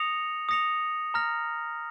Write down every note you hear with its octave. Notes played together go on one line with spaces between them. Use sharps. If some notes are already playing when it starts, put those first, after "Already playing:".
Already playing: D#6 A#6 C#7 F7
D#6 A#6 C#7 F7
A#5 F6 A#6 F7